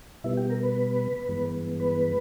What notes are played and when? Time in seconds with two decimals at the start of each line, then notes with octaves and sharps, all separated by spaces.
0.24 B2 G3 B3 E4 E5
0.37 G4 G5
0.49 A#4 A#5
0.63 B4 B5
1.29 G2 E3 G#3 B3
1.80 B4 B5